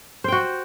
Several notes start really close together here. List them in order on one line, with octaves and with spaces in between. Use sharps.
C5 G5 F#4